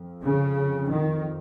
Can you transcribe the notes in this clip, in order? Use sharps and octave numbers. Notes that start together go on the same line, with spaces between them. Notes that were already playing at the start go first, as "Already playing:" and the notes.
Already playing: F2
C#3
D#3